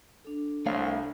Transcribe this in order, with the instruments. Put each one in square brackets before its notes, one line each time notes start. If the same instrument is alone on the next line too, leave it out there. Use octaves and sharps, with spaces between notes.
[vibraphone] D4 A4
[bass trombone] C2 [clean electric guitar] A3 C#5 F5